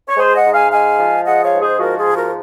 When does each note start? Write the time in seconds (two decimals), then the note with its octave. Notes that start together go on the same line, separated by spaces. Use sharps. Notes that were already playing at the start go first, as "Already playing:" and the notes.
0.08 C#5
0.17 G#3 G#4 C5
0.35 D#5 F#5
0.45 G#2
0.53 F5 G#5
0.71 G#3 F5 G#5
0.98 F3
1.25 G#3 D#5 F#5
1.44 C#5 F5
1.52 G#2
1.62 G#4 C5
1.80 F3 F#4 A#4
1.98 F4 G#4
2.07 G#2
2.15 F#4 A#4